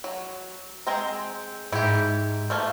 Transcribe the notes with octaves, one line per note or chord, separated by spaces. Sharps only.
F#3
G#3 C4 A#5
G#2 E4 G4
F3 A3 A#3